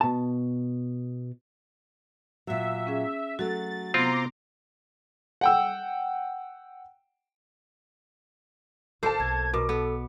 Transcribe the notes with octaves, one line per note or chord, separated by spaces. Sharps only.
B2 A5
A#2 F#3 E5
C#4 G#4
F#3 A3 F#4 A4 A6
C3 B3 C4 F4 A#5 C6 D6
F#5 G5 E6
A1 D#3 A#3 A4 C5 A5
B1 G#6
B2 A#4 D6
B3 A4